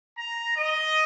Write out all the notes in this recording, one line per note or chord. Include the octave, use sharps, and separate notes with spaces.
A#5
D#5